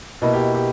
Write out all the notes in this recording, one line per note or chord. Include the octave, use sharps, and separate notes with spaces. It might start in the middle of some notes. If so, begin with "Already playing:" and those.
B2 A#3 E4 D#5
G4
G4